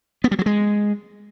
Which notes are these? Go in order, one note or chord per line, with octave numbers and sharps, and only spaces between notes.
B3
G3
F#3
G#3